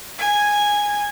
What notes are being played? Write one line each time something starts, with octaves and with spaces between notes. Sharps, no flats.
G#5